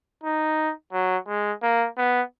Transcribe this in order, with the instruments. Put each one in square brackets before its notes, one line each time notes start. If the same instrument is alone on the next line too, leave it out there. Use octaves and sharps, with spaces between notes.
[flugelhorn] D#4
F#3
G#3
A#3
B3